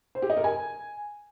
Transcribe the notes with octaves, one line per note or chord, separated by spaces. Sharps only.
C5
G4
D#5
A#4
G#5